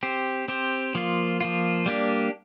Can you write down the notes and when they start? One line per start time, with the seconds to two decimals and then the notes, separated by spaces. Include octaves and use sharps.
0.03 C4 G4 C5
0.48 C4 G4 C5
0.95 F3 A#3 F4
1.40 F3 A#3 F4
1.86 G3 A#3 D4 G4